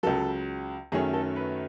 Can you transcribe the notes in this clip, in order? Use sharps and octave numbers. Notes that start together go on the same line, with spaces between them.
C#2 C#3 F#3 A4
F#2 D#3 F#3 A3 C#4 G#4
A4
B4